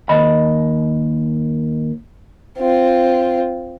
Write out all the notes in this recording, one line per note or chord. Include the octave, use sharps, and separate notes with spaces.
D#2 D#5 B5
C4 F4